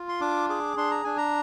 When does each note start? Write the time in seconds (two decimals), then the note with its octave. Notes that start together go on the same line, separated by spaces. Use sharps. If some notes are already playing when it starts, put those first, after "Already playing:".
Already playing: F4
0.09 C6
0.21 D4 D6
0.49 G#4 D6
0.77 D4 C6
0.91 A#5
1.04 D4 G#5
1.17 A#5